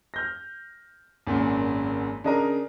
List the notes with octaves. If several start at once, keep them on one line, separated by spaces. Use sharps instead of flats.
F6 G6 A#6
G#1 F#2 A#2
C#3 D4 A#4 D#5 A#5